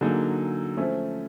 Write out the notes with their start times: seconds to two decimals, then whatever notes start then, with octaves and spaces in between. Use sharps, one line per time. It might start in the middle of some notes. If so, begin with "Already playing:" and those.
0.01 D3 F#3 A#3 D#4 G#4
0.77 F3 A3 C#4